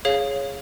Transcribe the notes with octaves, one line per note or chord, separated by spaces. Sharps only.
G#4 C#5 F5